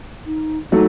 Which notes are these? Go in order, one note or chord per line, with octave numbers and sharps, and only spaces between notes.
D#4
F#3 A3 D#4